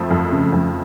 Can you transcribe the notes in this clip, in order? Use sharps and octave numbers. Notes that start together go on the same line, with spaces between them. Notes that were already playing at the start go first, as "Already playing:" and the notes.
Already playing: F2 F3 A3
F2
C#3
F2